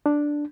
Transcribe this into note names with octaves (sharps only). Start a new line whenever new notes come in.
D4